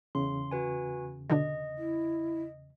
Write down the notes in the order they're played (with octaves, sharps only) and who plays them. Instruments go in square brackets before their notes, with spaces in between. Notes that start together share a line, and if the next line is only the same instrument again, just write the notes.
[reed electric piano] E2 C#3 [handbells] C6
[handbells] F#4 B4 G#5
[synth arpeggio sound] B2 D3 D4 [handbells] D#5
[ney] E4